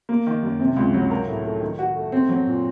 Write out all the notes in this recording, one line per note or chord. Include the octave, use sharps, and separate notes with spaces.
A#3
D#3
F#2
C3
C#2
F#3
A#4
A2
A3
D#3
F#4
A3
C4
F#3
A#2